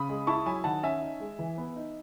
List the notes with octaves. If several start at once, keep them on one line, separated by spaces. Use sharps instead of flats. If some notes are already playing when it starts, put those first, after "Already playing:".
Already playing: C#3 B5 D#6
G#3
E4 A5 C#6
F#3 G#5 B5
D#3 F#5 A5
C#4 E5 G#5
D#4
G#3
E3
B3
D#4